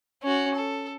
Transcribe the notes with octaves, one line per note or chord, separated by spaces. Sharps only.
C#4 F#4
A4